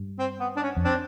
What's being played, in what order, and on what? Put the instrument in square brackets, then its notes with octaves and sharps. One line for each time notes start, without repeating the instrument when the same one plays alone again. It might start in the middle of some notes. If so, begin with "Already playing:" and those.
Already playing: [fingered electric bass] G2
[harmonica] C4
B3
D4
C#4
[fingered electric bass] F2
[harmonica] C4 D4